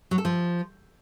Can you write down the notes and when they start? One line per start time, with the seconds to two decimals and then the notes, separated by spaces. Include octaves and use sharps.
0.11 F#3
0.18 A4
0.25 F3